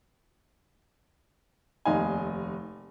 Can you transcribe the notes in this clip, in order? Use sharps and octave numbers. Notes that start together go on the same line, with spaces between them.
F1 D#2 D#4 F5 G#5